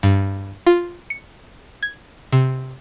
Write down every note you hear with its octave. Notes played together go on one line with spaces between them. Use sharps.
G2
F4
C#7
G#6
C3